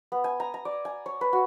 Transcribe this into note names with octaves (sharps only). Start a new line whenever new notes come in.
B3
G#5
A#5
A#5
D5
G#5
C#5
B4
F#4